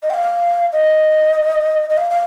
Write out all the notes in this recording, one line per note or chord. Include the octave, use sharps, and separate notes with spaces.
D#5
G5
F5
D#5
D#5
F5
F5